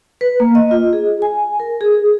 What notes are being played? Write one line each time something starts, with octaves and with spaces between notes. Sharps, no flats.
B4
A#3
D#5
F4
G#4
G#5
A#4
G#4